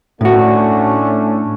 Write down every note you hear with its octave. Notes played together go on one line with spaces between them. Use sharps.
A2 A3 C#4 D4 F#4